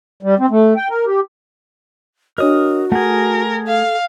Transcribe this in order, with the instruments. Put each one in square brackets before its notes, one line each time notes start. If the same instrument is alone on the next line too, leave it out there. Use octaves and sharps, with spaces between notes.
[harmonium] G3
C4
A3
G5
A#4
G4
[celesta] D4 C#5 D#5 [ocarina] F#4 [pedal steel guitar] A#4 D#6
[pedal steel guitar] A3 G#4 [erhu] A#4 [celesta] F#5
[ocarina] A4 [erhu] F5